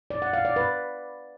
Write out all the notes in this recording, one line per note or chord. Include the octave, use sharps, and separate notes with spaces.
D5
F#5
F5
D5
B4